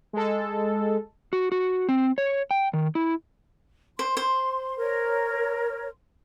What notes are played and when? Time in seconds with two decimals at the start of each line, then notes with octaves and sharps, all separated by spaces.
0.13 G#3 A4
1.33 F#4
1.52 F#4
1.89 C4
2.18 C#5
2.51 G5
2.73 D#3
2.95 E4
3.99 C5 C6
4.17 C5
4.79 A#4 C#5